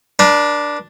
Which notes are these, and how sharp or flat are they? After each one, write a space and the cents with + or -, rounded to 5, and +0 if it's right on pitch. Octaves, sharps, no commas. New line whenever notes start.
D4 +0 A#4 +45